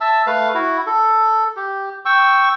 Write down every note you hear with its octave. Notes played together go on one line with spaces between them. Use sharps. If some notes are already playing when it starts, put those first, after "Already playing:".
E5 A5 E6
A3 B4 F5
E4 F#4
A4
G4
G5 C#6 E6